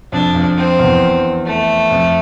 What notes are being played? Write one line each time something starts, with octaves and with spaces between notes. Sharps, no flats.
F2 D4
F2
C4
E2
A3
F2